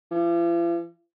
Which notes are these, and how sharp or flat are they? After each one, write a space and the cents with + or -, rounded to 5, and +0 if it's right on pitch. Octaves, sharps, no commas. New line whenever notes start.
F3 -45